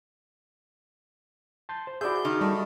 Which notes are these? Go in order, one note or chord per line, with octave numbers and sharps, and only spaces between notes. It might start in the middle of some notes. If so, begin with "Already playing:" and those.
A5 C6 G6
C5
E4 F#4 G#4 D5 E5 G6
D#3
G3 A3